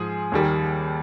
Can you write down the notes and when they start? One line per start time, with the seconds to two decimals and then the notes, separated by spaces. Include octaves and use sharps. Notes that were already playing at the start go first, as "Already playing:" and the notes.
Already playing: G#2 F3 G#4
0.32 D#2 D#3 G3